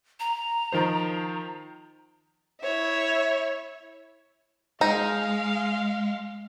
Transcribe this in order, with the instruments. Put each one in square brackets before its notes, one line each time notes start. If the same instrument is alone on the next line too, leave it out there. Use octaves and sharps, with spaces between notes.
[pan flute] A#5
[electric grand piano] D#3 F3 C5
[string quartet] E4 C#5 E5
[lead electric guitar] G#3 [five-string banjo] D#4 [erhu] F5